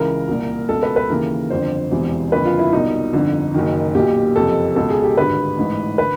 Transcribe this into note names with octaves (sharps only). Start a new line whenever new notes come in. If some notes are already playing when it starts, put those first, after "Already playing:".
Already playing: C#2 C#3 E3 A#4
C2 A#2
C#2 B2 A4
B4
B4
D#2 C#3 E3 A#4
G1 F2 D3 C5
E1 E2 C3 E3
F#1 F2 D3 B4
F4
E4
C2 B2 D#4
G1 F2 D3
F#1 F#2 D#3
B1 A#2 G4
F#1 F2 C3 A4
C#2 B2 A4
G#4
G4
G#1 G2 D3 B4
A1 G#2 E3
D3 B4